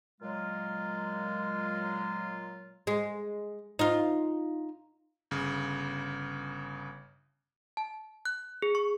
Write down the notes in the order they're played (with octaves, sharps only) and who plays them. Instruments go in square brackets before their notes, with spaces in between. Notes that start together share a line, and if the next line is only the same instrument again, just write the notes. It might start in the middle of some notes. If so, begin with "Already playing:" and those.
[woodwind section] A#2 F#3 G#3 F4
[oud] G#3
D#4 F4
[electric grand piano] G1 C#3
[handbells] A5
F#6
G#4
C#6